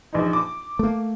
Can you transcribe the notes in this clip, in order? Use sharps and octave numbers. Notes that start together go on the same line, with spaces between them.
A#1 D#4
D6
A3 A#3